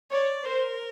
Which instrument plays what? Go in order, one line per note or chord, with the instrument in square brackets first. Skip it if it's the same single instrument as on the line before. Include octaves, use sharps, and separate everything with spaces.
[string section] C#5 [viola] D5
[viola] A#4 [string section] C5